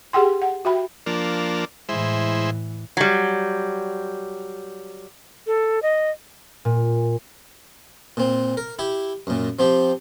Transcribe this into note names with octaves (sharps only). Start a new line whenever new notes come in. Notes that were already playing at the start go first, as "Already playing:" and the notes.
G4 G#4 F#5 G5 C6
F#5
F#4 E5 G5 B5
F3 A#3 D4
A2 E3 G#3 E4 C5
F#3 G3
A4
D#5
A#2
A#2 C4
A#4
E4 G4
F#2 A#2
F3 C4 G4